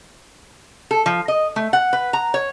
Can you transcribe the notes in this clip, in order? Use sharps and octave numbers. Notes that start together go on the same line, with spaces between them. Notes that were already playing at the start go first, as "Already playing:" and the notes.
A4
F3
D#5
A3
F#5
B4
A#5
C#5